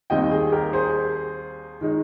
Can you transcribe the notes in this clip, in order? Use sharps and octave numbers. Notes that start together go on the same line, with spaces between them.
D#2 D#3 G3 C4 D#5 G5
G#4
G4 A#4
G#4 C5
D#3 G#3 D#4